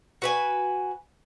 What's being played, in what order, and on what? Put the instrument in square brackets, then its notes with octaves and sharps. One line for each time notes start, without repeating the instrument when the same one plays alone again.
[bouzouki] F#4 B4 G#5